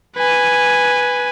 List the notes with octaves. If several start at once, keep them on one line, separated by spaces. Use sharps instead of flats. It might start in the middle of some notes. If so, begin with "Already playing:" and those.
B4 G#5